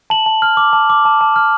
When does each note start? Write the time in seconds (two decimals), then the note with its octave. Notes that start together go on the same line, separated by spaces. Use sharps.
0.10 A5 F#7
0.26 A5
0.42 F6
0.57 D6
0.73 A5
0.90 D6
1.05 A5
1.21 A5
1.36 F6